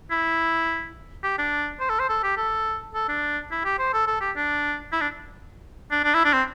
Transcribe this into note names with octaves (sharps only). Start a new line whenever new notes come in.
E4
G4
D4
C5
A4
C5
A4
G4
A4
A4
D4
E4
G4
C5
A4
A4
G4
D4
E4
D4
D4
D4
E4
D4
C4